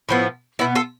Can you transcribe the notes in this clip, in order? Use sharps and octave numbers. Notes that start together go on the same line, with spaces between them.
A2 F3 B3 E4
B2 B3 E4
F4 A4